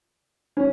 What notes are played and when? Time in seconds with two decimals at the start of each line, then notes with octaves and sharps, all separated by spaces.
0.57 C#4